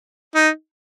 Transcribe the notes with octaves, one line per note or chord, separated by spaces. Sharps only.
D#4